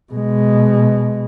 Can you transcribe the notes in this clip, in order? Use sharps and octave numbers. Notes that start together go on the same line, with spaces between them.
B2 G#3